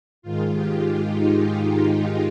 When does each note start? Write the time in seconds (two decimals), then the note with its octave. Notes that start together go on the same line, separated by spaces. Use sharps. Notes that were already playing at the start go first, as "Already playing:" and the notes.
0.22 G#2 D#3 G#3 F4
0.52 G4
0.82 G4
1.11 D#4